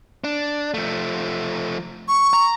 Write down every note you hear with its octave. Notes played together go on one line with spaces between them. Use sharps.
D4
F3 A3
C#6
A#5